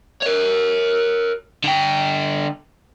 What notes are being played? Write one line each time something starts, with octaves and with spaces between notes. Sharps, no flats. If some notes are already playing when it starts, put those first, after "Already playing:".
A#4 C#5
D3 G5